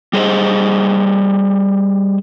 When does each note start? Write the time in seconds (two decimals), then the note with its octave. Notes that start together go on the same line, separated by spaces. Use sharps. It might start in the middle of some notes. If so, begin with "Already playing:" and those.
0.13 G3 G#4 C5 D#5